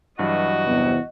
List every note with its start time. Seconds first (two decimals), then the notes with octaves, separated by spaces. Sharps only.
0.19 G2 E3 F#3 F#4 D#5
0.66 E2 C3